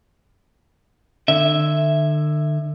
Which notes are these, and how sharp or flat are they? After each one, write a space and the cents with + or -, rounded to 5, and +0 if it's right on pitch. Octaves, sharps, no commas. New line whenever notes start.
D3 +40 E5 +0